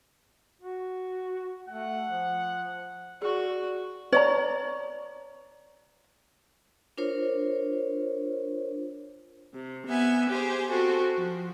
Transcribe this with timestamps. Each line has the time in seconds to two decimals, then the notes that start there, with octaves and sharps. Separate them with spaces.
0.61 F#4
1.69 A3 F#5
2.08 F3
3.22 F#4 G#4 D5
4.13 C#5 D5 A#5
6.97 D4 F4 A#4 C5 C#5
9.54 C3
9.86 B3 E5 G#5
10.29 G4 G#4 C5
10.70 C4 F#4 A4
11.15 F3